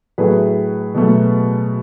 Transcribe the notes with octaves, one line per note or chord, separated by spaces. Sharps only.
A2 F#3 A3 G#4 B4
B2 F#3 A3